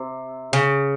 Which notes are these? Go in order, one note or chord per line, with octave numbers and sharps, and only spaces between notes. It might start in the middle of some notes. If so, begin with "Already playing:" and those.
Already playing: C3
C#3